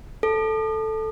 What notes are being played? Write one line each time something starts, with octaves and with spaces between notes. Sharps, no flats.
A4